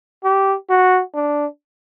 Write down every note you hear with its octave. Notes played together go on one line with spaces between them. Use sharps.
G4
F#4
D4